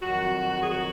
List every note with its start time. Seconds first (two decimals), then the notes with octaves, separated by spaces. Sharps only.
0.02 F2 D#3 F#3 F#4
0.62 G#4
0.71 F#4